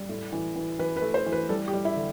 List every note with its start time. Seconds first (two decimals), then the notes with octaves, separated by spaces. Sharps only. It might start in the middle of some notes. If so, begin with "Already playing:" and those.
Already playing: G3
0.09 A2
0.33 E3
0.56 E3
0.79 E3 B4
0.97 B4
1.02 A3
1.14 C5
1.26 E3
1.32 B4
1.49 G3 A4
1.68 G4
1.73 G3
1.85 E4
1.97 D3